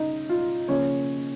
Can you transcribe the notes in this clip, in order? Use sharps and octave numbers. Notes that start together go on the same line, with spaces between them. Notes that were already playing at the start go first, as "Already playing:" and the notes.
Already playing: C#3 D#4
F4
C#3 F3 A#3 C#4 C#5